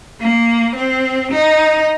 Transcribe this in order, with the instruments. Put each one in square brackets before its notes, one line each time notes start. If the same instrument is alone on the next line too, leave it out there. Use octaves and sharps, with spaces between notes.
[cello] A#3
C4
D#4